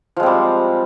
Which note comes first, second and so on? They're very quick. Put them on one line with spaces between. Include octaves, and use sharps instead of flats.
F3 G#3 C4 G3